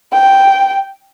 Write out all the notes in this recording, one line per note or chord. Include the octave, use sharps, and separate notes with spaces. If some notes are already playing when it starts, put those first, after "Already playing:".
G5